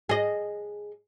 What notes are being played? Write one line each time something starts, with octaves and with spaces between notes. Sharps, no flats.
G#4 D#5